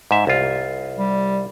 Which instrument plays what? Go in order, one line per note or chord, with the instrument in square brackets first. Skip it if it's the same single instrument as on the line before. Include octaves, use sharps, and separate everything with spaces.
[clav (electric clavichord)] G#2 E5
C2 F4
[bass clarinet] G3